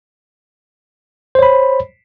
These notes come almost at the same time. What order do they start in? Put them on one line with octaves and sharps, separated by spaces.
C5 C#5 B5